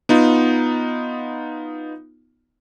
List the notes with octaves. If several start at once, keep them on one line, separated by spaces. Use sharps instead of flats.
B3 D#4 F4